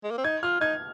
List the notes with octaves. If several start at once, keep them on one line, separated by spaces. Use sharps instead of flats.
G#3
A#3
C4
D#4 G#6
F4 F6
D#4 G#6